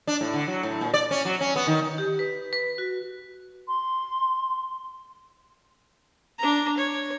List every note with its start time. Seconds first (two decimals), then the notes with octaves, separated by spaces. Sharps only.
0.07 D4
0.21 A2
0.34 D3
0.48 F#3
0.63 A2
0.81 A#2
0.94 D5
1.11 C#4
1.25 F#3
1.41 C#4
1.56 B3
1.67 D#3
1.98 G4
2.19 B4
2.53 B4
2.78 F#4
3.68 C6
6.39 D4 A#5
6.77 C#5